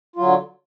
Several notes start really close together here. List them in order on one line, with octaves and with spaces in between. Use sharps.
F4 F#3 D3